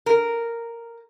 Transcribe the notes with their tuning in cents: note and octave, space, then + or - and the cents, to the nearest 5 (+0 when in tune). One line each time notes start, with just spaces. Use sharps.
A#4 -5